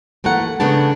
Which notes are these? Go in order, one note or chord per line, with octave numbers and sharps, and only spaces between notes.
E3 A3 A#3 A#4 F#5
C#3 A3 B3 D4 A5